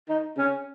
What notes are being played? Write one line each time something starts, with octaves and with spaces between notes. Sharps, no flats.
D#4
C#4